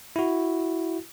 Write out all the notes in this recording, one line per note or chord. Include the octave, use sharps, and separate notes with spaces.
E4 F#4